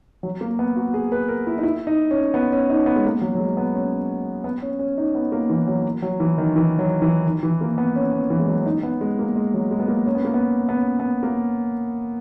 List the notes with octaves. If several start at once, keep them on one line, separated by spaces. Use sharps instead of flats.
F#3
A#3
B3
F#4
G#4
B4
A#4
E4
D#4
E4
D#4
C#4
B3
C#4
D#4
B3
G#3
A#3
F#3
F#3
G#3
B3
C#4
B3
C#4
C#4
D#4
B3
A#3
E3
F#3
F#3
E3
D#3
E3
F#3
E3
D#3
E3
A#3
B3
C#4
B3
E3
G#3
F#3
C#4
D#4
B3
G#3
A#3
G#3
F#3
G#3
B3
A#3
C#4
B3
A#3
B3
B3
C#4
B3
A#3